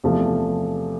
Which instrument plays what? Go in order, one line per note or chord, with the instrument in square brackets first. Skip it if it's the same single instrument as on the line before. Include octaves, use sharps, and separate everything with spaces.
[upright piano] E2 C3 F3 A3